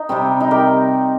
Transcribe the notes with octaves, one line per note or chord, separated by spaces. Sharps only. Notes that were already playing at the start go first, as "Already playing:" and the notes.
Already playing: D#4
C3 G3 C4
D#4
G4 A#4